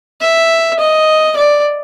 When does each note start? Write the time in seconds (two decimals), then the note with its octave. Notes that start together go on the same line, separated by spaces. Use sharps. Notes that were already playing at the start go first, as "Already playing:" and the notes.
0.21 E5
0.79 D#5
1.36 D5